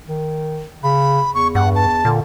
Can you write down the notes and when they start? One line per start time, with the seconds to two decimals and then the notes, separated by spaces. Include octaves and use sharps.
0.07 D#3
0.83 C#3 B5
1.34 E2 C#6
1.55 G2 F#5
1.75 A5
2.05 A#2 D3